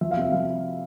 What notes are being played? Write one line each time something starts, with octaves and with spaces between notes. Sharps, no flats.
F3 E5
F5
C3 E5
F3 F5